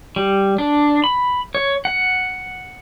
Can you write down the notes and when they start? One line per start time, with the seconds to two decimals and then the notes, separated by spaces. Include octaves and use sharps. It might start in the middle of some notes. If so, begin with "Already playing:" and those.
0.16 G3
0.58 D4
1.04 B5
1.55 C#5
1.85 F#5